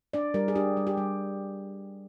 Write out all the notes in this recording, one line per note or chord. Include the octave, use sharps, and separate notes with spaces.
D4 D5
G3 A#4
G#4
D4 G4
G3
G4
G3